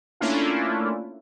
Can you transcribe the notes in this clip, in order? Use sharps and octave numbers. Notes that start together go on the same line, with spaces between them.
A3 A#3 C#4 D4 E4 F4